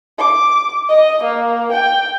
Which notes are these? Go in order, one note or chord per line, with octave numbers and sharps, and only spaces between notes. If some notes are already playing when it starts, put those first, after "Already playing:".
D6
D#5
A#3
G5